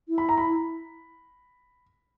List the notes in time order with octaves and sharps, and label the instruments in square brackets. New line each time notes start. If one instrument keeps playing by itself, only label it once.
[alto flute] E4
[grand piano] B5
A#5
B5